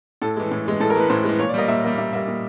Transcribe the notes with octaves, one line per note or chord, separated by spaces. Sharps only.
A2 A4
E3 G#3
A2
E3 G#3
A2 A4
A#4
E3 G#3 B4
A2 C5
E3 G#3
A#2 C#5
D5
G3 A#3 D#5
A#2 E5
G3 A#3
A#2 E5
G3 A#3 E5
A#2